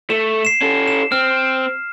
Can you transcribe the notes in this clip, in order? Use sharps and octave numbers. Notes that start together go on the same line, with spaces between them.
A3 E7
C7 E7
C#4 A4
E7
C4 F6